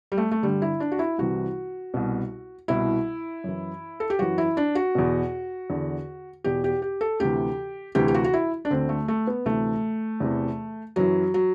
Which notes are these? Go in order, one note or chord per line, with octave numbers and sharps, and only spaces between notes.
G3
A3
A3
G2 D3 G3
E4
D4
F#4
E4
C2 C3 E3 F#4
C2 B2
C2 B2 E4
F#2 E3
A4
G4
F#2 E3 F#4
E4
D4
F#4
E2 B2
E2 D3
E2 B2 G4
G4
G4
A4
D2 C3 E3 G4
D2 C3 E3 G4
G4
F#4
F#4
E4
D4
D2 D3 C4
A3
A3
B3
D2 C3 E3 A3
E2 C3 E3
F#2 E3 F#3
F#3